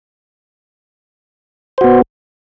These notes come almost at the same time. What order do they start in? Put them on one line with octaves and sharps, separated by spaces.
C5 F#4 B3